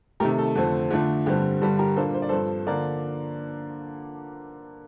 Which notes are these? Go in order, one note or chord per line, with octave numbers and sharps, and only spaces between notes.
C3 D#3 A3 G4 A#4
A4
F2 D3 A3 C4
D3 F3 A3 D4
G2 D3 G3 C4 G4
G2 D3 G3 A4
G4 A#4
A#2 G3 A#3 D4 A4 C5
C5
D5
G2 F3 C4 A4 C5
D3 F3 A#3 A#4 D5